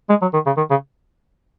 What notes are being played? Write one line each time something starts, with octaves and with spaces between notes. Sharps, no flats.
G#3
F#3
D#3
C#3
D#3
C#3